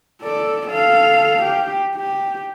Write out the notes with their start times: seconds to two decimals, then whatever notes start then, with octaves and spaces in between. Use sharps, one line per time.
0.23 A4 D5
0.68 A4 F5
1.43 G4
1.96 G4